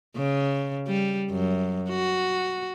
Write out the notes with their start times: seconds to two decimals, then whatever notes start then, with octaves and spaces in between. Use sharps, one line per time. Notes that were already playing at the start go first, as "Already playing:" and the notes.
0.16 C#3
0.88 G3
1.31 F#2
1.90 F#4